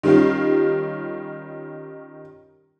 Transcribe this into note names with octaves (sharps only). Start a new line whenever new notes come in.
D#3 G3 C#4 F4 G4